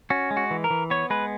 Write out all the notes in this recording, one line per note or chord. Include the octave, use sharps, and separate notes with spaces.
C#4 F#4
G#3
F#4
E3
A#4
E3
B3 C#5
G#3 B4